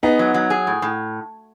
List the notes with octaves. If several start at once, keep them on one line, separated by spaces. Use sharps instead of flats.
B3 D#4 G#4
F#3
F#3
G#4
A2
A2